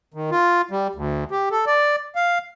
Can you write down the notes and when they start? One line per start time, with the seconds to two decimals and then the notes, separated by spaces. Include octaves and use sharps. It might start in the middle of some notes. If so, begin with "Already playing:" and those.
0.14 D#3
0.31 F4
0.71 G3
0.95 D2
1.31 G4
1.51 A4
1.67 D5
2.15 F5